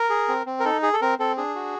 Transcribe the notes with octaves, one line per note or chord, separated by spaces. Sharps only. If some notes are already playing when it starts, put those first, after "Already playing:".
Already playing: A#4
G#4
C4
C4
A#4
D#4 A4
G#4
A4
C4 A#4
C4 A4
D4 G#4
F#4